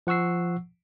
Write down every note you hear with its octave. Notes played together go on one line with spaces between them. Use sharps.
F3 F#5 C#6 E6 C7